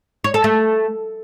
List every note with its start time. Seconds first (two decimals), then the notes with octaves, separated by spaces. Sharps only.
0.24 C#5
0.34 A4
0.44 A3